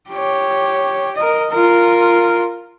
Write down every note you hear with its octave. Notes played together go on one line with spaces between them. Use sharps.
G4 C#5
A#4 D#5
F4 A#4